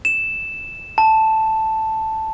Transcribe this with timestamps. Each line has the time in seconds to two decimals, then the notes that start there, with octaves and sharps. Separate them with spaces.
0.05 E7
0.98 A5